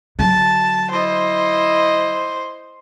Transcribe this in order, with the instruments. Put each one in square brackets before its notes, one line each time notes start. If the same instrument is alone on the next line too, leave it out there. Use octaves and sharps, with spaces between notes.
[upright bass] D3 F#3 [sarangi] A5
[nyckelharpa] E4 D#5 [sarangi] C5